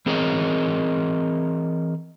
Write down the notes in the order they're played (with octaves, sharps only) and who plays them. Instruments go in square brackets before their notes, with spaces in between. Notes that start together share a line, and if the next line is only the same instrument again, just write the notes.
[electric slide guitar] E3 C4 G#4 A#4 C#5 D#5